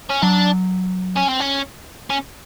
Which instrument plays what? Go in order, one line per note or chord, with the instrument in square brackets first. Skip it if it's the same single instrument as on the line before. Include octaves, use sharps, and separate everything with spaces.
[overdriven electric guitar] C#4
[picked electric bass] F#3 [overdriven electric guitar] D4
[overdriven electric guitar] C#4
C4
C#4
C#4